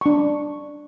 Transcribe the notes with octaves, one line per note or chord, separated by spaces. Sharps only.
D4 C#6